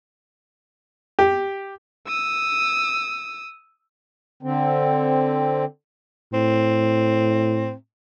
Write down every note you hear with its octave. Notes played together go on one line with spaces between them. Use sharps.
G4
D#6 E6
D3 C4
A2 C4